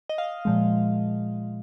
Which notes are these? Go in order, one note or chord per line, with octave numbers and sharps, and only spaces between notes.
D#5
F5
A#2 F3 G#3